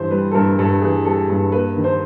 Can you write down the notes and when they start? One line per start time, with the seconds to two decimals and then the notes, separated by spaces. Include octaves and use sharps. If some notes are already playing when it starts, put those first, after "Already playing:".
Already playing: G2 E3 C5
0.11 G3 B4
0.31 A4
0.35 G2 A#4
0.58 G2 A4
0.81 E3 G#4
1.05 G3 A4
1.29 G2
1.52 A#3 B4
1.77 D#3
1.84 C5